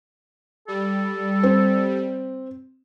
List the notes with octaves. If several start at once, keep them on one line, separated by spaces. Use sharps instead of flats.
G3 A4
C4